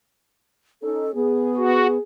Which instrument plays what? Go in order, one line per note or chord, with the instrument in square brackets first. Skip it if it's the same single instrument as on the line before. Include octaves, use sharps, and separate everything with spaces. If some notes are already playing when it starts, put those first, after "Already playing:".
[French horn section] C#4 D#4 [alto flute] A4
[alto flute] B3 [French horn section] G#4
[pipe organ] F#4